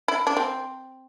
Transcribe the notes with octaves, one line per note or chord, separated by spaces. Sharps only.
E4
D4
C4